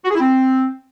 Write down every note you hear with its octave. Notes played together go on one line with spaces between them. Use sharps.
F#4
G#4
E4
C4